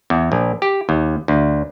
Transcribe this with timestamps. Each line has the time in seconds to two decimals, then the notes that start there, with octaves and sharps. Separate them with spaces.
0.10 E2
0.32 A#1
0.62 G4
0.89 D#2
1.28 D2